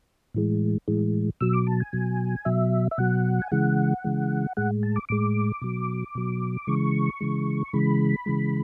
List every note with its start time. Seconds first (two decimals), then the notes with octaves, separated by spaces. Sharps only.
0.34 A2 E3 G#3
0.88 A2 E3 G#3
1.41 B2 F#3 E6
1.53 D6
1.67 A5
1.80 G#5
1.93 B2 F#3
2.45 B2 F#3 E5
2.91 E5
2.98 B2 F#3 F#5
3.42 G#5
3.52 C#3 E3 G#3 F#5
4.04 C#3 E3 G#3
4.57 A2 G#3 F#5
4.83 A5
4.96 D6
5.09 A2 G#3 D6
5.62 B2 F#3
6.15 B2 F#3
6.67 C#3 E3 G#3 C#6
7.20 C#3 E3 G#3
7.73 C#3 E3 G#3 B5
8.26 C#3 E3 G#3